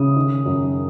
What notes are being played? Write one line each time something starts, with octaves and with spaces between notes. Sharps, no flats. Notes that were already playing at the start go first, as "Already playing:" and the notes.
Already playing: C#3 D#6
D#3
F#2